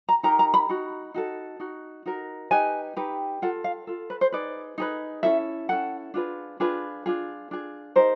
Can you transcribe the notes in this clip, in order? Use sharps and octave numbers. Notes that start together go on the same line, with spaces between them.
A#5
D#4 G4 A#4 A#5
A#5
B5
D#4 F#4
D#4 F#4 A4
D#4 F#4
D#4 F#4 A#4
D#4 G4 B4 G#5
D#4 G4 B4
F4 A4 F#5
F5
F4 A4
B4
C5
D#4 G#4 B4 D5
D#4 G#4 B4
C#4 E4 A4 E5
C#4 E4 A4 F#5
D4 F4 G#4 B4
D4 F4 G#4 B4
D4 F4 G#4
D4 F4 G#4
D#4 G4 A#4 C5